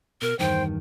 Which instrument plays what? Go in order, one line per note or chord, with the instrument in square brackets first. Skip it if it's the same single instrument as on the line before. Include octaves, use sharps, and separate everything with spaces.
[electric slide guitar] B2 [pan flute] A#4
[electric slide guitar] E2 G2 D#3 [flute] C5 [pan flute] G5